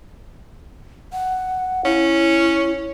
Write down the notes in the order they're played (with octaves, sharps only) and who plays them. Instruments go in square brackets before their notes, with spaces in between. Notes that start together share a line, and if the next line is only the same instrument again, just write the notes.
[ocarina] F#5
[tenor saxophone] C#4 [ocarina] E4